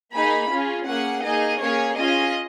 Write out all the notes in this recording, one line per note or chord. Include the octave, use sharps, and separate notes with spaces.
A#3 D#4 G#4 B5
C#4 F4 G#4
A#3 C#4 G#4 F#5
A#3 D#4 G#4 D#5
A#3 C#4 G#4 C#5
C#4 F4 G#4 D#5